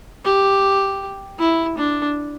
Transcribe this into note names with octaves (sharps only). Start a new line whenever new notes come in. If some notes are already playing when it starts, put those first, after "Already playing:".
G4
E4
D4